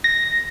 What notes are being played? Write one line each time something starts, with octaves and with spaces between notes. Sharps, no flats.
A#6